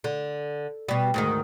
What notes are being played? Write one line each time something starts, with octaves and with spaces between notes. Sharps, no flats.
D3
B2 G3
D2 G#2 D#3